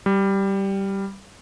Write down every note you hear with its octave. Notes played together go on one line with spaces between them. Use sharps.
G3